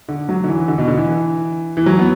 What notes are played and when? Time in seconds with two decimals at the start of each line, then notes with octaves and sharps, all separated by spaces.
0.09 D3
0.29 F#3
0.44 D3
0.48 E3
0.68 D3
0.78 B2
0.88 D3
0.97 E3
1.77 E3
1.86 F#3
1.99 B3